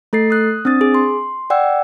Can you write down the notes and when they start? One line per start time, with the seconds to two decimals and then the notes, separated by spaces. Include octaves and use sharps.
0.13 A3 A4 A6 C7
0.30 D#6 F#6
0.65 C4 D4 D#6 A6
0.81 G#4
0.94 C6
1.50 D5 F#5 G5 E6